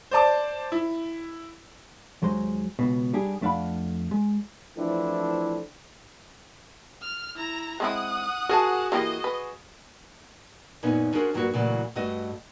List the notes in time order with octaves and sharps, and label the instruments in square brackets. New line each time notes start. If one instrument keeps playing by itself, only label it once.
[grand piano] C5 D5 A5 D6
E4
[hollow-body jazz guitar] D#2 F#3 G#3 C5
C#2 B2
G3 D4 G4 G#4
F2 A3 D4 F5 F#5 B5
G#3
[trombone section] E3 F3 A3 C4 D4 E4
[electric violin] F6
E4 A#5
[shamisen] G#3 C4 E4 [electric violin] F#5 D#6
[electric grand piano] F#4 G#4 [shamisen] A#4 A5
[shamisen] E3 A#3 G4 [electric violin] D#5
[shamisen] B4
[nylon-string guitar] F#2 A#2 B3 C#4 D#4
C#4 D4 F#4 G#4 A#4 C5
G2 F#3 A#3 D4 F4 F#4
A#2 C#3 E3 F#3 A3
G2 A3 F#4 D#5